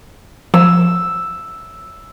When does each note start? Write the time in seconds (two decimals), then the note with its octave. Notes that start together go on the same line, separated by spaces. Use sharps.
0.54 F3 E6